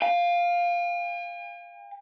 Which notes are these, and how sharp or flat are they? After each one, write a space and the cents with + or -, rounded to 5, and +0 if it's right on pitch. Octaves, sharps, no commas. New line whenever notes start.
F5 +0 G#5 -45